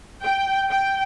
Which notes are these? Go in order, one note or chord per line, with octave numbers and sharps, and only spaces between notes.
G5
G5